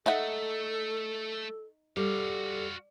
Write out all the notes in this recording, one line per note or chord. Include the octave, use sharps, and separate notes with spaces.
A3 D#4 A4 E5 F#5
G3 F#4 A4 F5